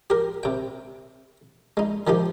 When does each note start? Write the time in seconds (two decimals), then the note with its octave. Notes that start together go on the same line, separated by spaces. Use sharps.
0.10 G4 A#4
0.43 C3 G5
1.77 G#3 D#4
2.07 D#3 F3 D#4 G4